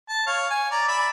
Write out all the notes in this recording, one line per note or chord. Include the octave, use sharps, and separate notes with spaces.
A5
C#5 F5
G#5
D5 A#5
D5 E5 B5